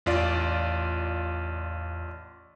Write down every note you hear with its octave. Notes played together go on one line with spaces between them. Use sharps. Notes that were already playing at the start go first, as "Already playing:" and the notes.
A1 E2 F4 D5